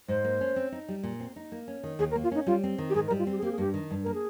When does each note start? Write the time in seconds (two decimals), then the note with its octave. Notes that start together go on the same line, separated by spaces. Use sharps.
0.08 G#2 C5
0.24 A#3
0.41 C#4
0.56 C4
0.72 D#4
0.88 G3
1.03 A#2
1.20 C4
1.36 D#4
1.52 A#3
1.68 C#4
1.83 D#3
1.99 D#2 G#4
2.11 A#4
2.16 A#3
2.23 F4
2.31 C#4 D#4
2.47 G3 F4
2.63 C4
2.78 D#3
2.90 G4
2.94 G#2 G#4
3.07 A#4
3.10 G3
3.18 F4
3.27 C4 G4
3.38 G#4
3.42 A#3 G4
3.52 G#4
3.58 G2 G4
3.74 D#3
3.91 G2
4.03 A#3 A#4
4.14 G#4